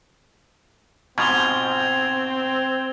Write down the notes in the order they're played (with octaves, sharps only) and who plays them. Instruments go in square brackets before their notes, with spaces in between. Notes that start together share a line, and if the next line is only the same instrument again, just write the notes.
[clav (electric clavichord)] G#2 B2 F3 [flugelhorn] C4 [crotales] G#6 F7 G7